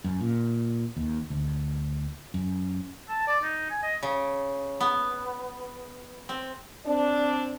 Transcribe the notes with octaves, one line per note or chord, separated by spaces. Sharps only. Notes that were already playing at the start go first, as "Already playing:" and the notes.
F#2
A#2
D#2
D2
F#2
A5
D5
D#4
G#5
D#5
C#3
B3
C4
C4 D4 D5